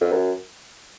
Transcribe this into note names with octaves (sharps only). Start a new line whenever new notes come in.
F2
F#2